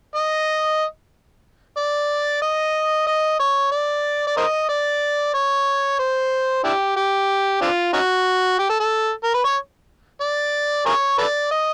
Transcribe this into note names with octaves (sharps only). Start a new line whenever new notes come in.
D#5
D5
D#5
D#5
C#5
D5
D5
A#4 C5 D#5
D5
C#5
C5
D4 E4 G4
G4
C4 D4 F4
C#4 D#4 F#4
G4
A4
A4
A#4
B4
C#5
D5
G#4 A#4 C#5
A4 B4 D5
D#5